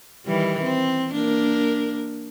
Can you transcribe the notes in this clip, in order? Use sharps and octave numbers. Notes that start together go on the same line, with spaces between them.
D#3 E3 G3
C4
A#3 D4 A#4